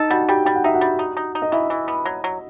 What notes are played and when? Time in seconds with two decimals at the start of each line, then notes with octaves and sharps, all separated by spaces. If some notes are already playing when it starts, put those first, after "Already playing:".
Already playing: D#4 A4 D#5
0.10 G3 F#4 F#5
0.28 G3 G4 G5
0.45 G3 G5
0.55 F#5
0.64 D#4 E5
0.74 F#4 F#5
0.81 G3
0.99 D#4
1.17 D#4
1.35 D#4
1.42 D#5
1.52 E3 E4 E5
1.70 E3
1.88 B3
2.05 F#3
2.24 F#3